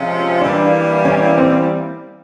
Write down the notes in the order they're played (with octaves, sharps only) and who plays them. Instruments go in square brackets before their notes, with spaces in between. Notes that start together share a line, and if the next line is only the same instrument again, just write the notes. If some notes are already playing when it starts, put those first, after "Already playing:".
Already playing: [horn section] C3 F3 G#3 C#4 F4
[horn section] E3 G3 A#3 [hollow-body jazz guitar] D4
[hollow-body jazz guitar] C#4
C4